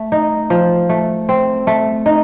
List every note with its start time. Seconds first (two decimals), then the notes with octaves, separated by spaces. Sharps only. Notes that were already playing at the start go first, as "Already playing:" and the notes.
Already playing: A3
0.12 D#4
0.50 F3
0.89 A3
1.29 C4
1.67 A3
2.06 D#4